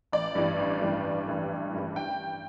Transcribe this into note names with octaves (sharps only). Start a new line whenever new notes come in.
A1 D5
G2 E3 G3
A1
G2 E3 G3
A1
G2 E3 G3
A1
G2 E3 G3
G5